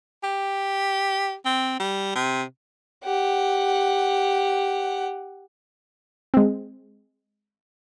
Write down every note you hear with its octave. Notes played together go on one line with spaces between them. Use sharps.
G4
C4
G3
C3
G4 F#5
G#3 C4